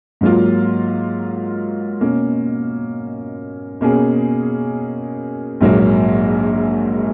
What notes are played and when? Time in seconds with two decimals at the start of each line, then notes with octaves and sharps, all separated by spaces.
0.21 G#2 F#3 A#3 F4
2.01 B2 A#3 C#4
3.81 B2 A#3 C#4 G#4
5.61 A#1 G#2 F#3 A#3